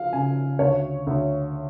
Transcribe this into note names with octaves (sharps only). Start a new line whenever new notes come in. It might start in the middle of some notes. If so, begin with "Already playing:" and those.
Already playing: F3 F5
C#3 G#5
D2 C#5
D2